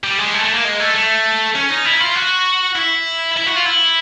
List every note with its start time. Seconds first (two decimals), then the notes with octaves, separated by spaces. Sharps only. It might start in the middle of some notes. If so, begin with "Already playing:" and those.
0.04 G3
0.19 G#3
0.34 A3
0.44 A3
0.54 A#3
0.64 G#3
0.80 A3
0.95 A3
1.55 C#4
1.70 D#4
1.85 E4
2.00 F4
2.15 F#4
2.75 E4
3.37 E4
3.46 F#4
3.56 F4
3.66 E4